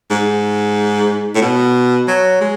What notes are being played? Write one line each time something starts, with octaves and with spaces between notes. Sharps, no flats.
G#2
A2
B2
F#3
G#3